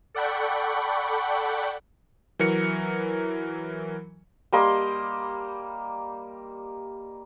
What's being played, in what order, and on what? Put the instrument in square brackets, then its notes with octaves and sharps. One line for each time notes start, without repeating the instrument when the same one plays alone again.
[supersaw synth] A4 D5 F#5 G5 B5 C#6
[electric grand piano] E3 F#3 A#4 C#7
[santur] G3 A#3 D#5 C6